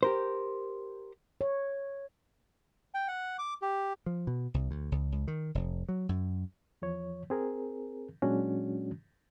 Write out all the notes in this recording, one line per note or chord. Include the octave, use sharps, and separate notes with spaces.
G4 A#4 C5
C#5
G5
F#5
D6
G4
F3
B2
C2
D2
C#2
C#2
D#3
F1
F#3
F#2
E2 F3 C#5
C4 G#4 A#4
A#2 F#3 G#3 C#4 D4 F#4